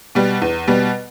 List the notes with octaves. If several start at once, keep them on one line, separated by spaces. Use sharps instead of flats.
B2 G3
E2
B2 G3